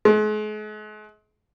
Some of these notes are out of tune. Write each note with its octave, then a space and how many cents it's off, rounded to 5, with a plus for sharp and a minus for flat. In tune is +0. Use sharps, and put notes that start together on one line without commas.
G#3 +40